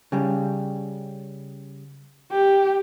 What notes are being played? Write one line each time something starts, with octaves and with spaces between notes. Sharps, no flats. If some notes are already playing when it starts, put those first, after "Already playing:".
C#3 G3
G4